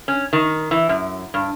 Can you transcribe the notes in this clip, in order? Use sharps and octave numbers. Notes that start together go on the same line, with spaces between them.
C#4
D#3
E3
F#2
G2